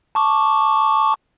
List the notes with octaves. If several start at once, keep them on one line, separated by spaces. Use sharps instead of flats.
A5 C#6 D6